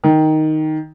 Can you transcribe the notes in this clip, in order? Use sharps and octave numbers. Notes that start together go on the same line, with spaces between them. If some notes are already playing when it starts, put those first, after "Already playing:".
D#3